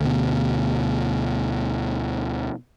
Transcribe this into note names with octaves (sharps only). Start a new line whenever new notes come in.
D2 B2